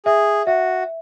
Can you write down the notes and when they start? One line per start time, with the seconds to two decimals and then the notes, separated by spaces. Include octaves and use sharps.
0.06 G#4 E5
0.47 F#4 E5